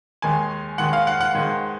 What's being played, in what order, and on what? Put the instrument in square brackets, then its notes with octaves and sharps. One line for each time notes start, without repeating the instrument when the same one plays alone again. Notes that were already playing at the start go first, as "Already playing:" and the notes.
[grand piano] D#2 D#3 G#3 G#5
D#2 D#3 G#3 F#5
F5
F#5
F#5
G#2 D#3 G#3